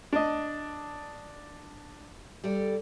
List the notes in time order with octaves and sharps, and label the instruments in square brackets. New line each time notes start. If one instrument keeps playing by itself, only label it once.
[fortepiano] D4 D#5
[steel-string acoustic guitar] G3 A4 D5